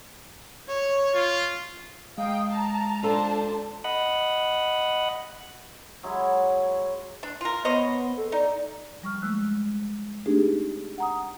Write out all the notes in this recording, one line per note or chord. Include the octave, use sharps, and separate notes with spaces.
C#5
F4
G#3 F5 G5 A#5 D#6
A5 A#5
D4 F4 A4 C5 A5
D#5 F#5 B5
F#3 G#3 E4
D4
F4 A#4
B3 C5 C#5 D#5
A4
D#4 D5
F3 G3 C#6 F6
G#3 A3 E6 F#6
A3 C4 D4 D#4 G4 G#4
F#5 A#5 D#6